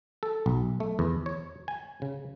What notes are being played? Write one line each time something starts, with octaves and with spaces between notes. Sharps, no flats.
A4
B1
A3
E2
C#5
G#5
C#3